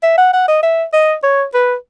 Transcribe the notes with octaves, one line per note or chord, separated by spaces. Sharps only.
E5
F#5
F#5
D#5
E5
D#5
C#5
B4